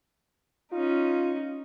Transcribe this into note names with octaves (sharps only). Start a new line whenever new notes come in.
C#4 D#4 F4